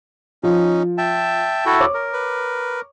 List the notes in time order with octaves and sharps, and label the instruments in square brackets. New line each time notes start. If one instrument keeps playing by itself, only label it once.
[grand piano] F3 [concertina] C#4 D#4
[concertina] E5 G5 [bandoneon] A5
[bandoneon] E4 F#4 A4
[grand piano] C#5 D6
[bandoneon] A#4
[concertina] B4